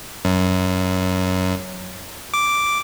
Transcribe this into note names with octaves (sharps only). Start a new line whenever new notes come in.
F#2
D6